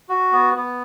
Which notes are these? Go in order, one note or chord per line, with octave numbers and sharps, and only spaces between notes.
F#4
B3
B3